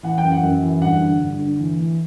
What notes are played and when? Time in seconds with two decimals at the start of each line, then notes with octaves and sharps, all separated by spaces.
0.03 E3 F#5
0.18 G5
0.23 F#2
0.32 F#5
0.43 F#2
0.62 E3
0.81 G2 F#5
1.01 D3
1.21 G2
1.39 D3
1.59 E3
1.78 E3